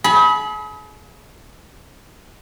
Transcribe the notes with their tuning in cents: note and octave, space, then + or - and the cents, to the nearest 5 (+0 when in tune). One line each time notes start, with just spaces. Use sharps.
G#4 +40 B5 -10